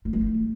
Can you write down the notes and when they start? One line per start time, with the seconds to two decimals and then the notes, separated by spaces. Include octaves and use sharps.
0.05 A3
0.13 G#3
0.21 A3